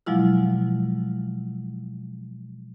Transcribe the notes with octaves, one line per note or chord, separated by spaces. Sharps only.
B2 F3 F#3 G#3 E4 F4